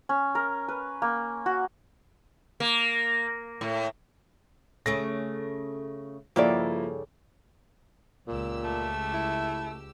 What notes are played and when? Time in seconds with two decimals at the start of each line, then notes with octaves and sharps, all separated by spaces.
0.09 C#4
0.35 A#4
0.68 B4
1.02 A#3
1.46 F#4
2.60 A#3
3.61 A2
4.86 C#3 A3 C#4 A#6 D7
6.36 G2 C#3 F3 A#3 E4 G4 A4 D5
8.27 C#2 A#2 G4 E6
8.64 A3
9.13 E4